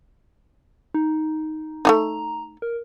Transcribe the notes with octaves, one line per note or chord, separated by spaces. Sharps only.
D#4
A3 D4 D#4 A#5
A#4